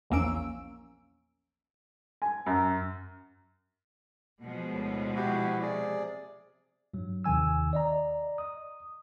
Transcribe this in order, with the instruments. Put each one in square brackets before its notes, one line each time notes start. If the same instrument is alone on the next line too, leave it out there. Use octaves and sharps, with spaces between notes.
[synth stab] A#1 E2 A#3 C#4 E6 D7
[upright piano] G#5
F#2
[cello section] B2 F3 G#3
[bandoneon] D2 A2
E4 F#4 G4
C3 G#4 D5
[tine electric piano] G2 F#3
D#2 C3 D#3 G#5 E6
D5 D#5 A#5
D#6